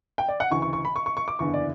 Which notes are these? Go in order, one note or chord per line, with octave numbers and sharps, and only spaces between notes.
G5
D5
F#5
D2 C#3 E3 C#6
C#6
C#6
B5
C#6
C#6
C#6
D6
F#1 E2 D3 C#6
D5